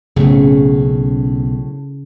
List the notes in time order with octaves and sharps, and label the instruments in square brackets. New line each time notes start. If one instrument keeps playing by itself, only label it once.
[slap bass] B1 [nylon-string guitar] A2 C4 C#4 [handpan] C#3